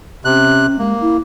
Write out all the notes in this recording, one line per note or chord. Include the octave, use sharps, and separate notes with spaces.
C3 C#4 F#6
G#3 A#3
E4